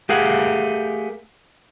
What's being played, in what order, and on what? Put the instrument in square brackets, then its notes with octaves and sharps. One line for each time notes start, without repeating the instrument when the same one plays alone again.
[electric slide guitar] A3 G4 G#4 A#4 F5 F#5